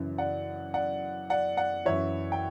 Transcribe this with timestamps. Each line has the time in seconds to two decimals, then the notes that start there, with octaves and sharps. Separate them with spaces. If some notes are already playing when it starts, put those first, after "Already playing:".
Already playing: F#2 C#3 E3
0.18 D5 F#5
0.74 D5 F#5
1.30 D5 F#5
1.57 D5 F#5
1.85 F#2 E3 C#5 E5
2.32 G5